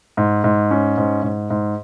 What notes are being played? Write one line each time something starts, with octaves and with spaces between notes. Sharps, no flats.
G#2
G#2
C#4
G#2
G#2
G#2